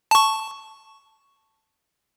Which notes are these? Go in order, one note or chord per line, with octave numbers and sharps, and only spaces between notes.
A5 C#6